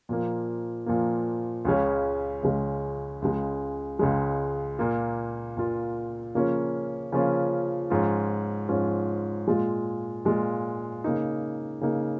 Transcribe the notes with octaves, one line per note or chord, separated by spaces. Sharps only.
A#2 F3 A#3
A#2 F3 A#3
C#2 C#3 G#3 C#4
C#2 C#3 G#3 C#4
C#2 C#3 G#3
C#2 C#3 G#3
A#2 A#3 F4
A#2 A#3 F4
C#3 F3 A#3 C#4 F4
C#3 F3 A#3 C#4 F4
G#2 F3 C#4 F4
G#2 F3 C#4 F4
A#2 G#3 F4
A#2 G#3 F4
C#3 A#3 D#4
C#3 A#3 D#4